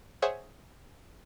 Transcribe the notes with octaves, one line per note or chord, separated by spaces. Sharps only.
G#4 C5 C#5 E5 F#5